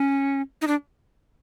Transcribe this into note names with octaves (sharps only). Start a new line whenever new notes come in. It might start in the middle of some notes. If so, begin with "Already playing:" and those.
Already playing: C#4
D#4
D4